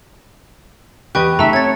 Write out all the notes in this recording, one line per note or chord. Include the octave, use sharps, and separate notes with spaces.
E2 B3 G4 B4 D#5 G5 C#6 F#6
C#3 A3 D#4 E5 A5 A#5 E6
C4 C#5 G#6 A6